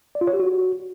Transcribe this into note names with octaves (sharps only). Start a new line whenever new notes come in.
D5
F4
C#5
G4
F#4